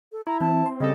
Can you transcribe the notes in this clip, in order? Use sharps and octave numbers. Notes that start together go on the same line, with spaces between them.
A4
E4 A#5
E3 C4 A5
C6
C#3 G3 A4 D#5